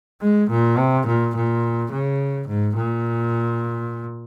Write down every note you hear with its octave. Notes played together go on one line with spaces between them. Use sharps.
G#3
A#2
C3
A#2
A#2
C#3
G#2
A#2